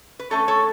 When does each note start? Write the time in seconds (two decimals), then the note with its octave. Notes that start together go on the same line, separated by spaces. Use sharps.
0.19 B4
0.31 D3 A3 C#4 A4 C#5
0.48 A4 C#5